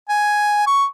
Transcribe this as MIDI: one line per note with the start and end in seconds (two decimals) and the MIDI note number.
0.09 0.66 80
0.67 0.85 85